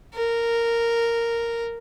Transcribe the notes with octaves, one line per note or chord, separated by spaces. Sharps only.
A#4